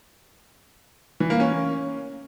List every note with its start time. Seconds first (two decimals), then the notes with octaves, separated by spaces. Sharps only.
1.20 E3
1.30 A#3
1.40 C#4